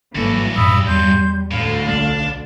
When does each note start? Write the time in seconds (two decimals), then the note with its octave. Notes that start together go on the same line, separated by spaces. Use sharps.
0.15 G#1 G2 C#3 E3 F#3 A#3 F#4 A4
0.56 A1 F#2 B2 G3 B5 D#6 E6
0.87 E2 C6 G6
1.51 D2 A2 D3 F5
1.88 B1 A3 D4